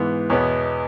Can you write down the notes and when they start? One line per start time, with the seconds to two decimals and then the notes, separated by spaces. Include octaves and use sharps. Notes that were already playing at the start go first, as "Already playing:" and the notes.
Already playing: G#2 E3 B3
0.30 E2 B2 B3 C#5